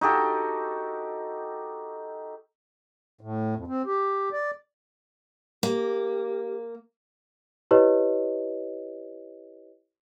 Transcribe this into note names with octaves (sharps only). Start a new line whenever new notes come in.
D#4 F#4 G4 A4
A2
F2
C4
G4
D5
A#3 G4
E4 G4 B4 C#5 D#5